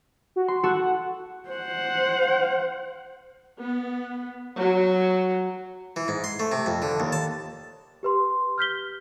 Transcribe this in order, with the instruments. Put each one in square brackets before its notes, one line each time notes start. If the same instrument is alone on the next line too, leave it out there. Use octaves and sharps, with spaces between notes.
[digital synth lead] F#4
[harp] C6
[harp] F#4 A4 E7 [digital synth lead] F#5
[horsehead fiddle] C5 F#5
[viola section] B3
F#3
[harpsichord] E3
G#2
C6
A3
C3
F2
D3
D#2
A5
[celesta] G4 B4 C6
F6 G6 B6 G7